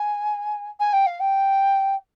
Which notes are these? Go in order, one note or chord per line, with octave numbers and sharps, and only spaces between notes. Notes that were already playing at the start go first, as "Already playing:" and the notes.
Already playing: G#5
G#5
G5
F5
G5